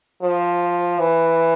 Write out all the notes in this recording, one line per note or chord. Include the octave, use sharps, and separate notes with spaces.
F3
E3